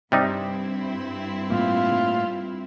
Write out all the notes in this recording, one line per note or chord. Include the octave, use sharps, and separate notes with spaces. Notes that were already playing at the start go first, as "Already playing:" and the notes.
G2 C3 G3 C4 D#4 E4
A2 A#3 F4